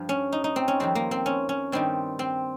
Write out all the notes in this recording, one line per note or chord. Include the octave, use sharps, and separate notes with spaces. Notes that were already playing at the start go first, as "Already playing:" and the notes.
Already playing: G2 F3
C#4
D#4
D#4
C4
C#4
F2 D#3 G3 C4
A#3
C4
C#4
C#4
G2 D#3 G3 C4
C4